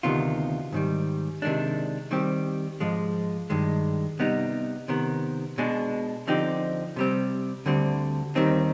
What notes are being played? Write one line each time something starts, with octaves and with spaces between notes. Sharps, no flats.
D2 C3 D#3 B3 F4
G#2 D#3 G3
C3 D#3 G#3 D4
D#3 G3 C4 G4
G#2 F3 G#3
G2 D#3 G#3
C3 G3 B3 D#4
C3 D#3 B3
B2 G#3 D4 G#4
D3 F3 C4 D#4 G4
C3 G3 C4
D2 D3 G3 C4
D#2 D#3 G3 C4 D#4